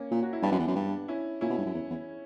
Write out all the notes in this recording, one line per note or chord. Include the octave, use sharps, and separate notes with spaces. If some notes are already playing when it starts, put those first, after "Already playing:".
Already playing: A#3 C#4
A#2
F#4
E4
G2 B3 D4
F#2
E2
F#2
G2
C#4 E4
A#2 C#4 E4
B2
G2
F#2
E2
E2